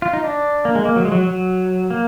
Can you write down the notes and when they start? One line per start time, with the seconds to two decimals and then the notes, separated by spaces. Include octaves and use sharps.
0.02 F4
0.13 D#4
0.24 D4
0.65 A#3
0.75 G#3
0.85 A#3
0.96 F#3
1.05 G#3
1.12 F#3
1.27 F#3
1.91 A#3